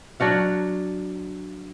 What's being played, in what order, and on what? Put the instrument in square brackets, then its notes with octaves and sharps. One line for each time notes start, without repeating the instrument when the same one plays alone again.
[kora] F#3 D4 F#4 F5